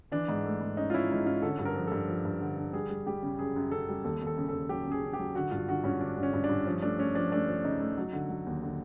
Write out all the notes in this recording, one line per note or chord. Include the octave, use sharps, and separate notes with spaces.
E3 D4
G#2
A3
G#2
C#4 D#4
F4
C#4 E4
G#2 D#4
C#4 F4
D3 A4
G2
A#4
F3
G2 A4
F3
G2
D3
D3
G3 G#4
G3
G3 G4
C#3
F#2 G#4
F#2
F#2 A4
G3
D#2 A4
D#2
A4
C#3
D#2 A4
F#3 G4
C#3 G#4
C#3
G4
F#3
D3 F#4
G2 F4
D3 F#4
G2 C#4
D3 D4
G2
C#4
G2
D4
G2
F3 C#4
A3 D4
A3 C#4
F3 D4
A3 D4
F3
C#3 D#4
A3
F#3
D3
F#3
D#2
D3